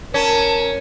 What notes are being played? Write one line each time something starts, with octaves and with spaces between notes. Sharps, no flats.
C#4 A#4 A5